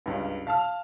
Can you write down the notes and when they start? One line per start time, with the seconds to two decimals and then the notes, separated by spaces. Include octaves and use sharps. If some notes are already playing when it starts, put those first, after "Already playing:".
0.06 C#2 G2
0.47 F5 A5 F6